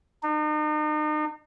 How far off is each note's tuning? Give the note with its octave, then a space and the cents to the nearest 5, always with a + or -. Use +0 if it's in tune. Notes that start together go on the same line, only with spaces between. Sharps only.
D#4 -40